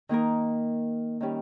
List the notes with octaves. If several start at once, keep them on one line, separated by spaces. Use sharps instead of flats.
D#3 A#3 D#4 A#4
D#3 G3 C#4